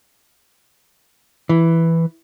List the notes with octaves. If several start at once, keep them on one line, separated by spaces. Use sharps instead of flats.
E3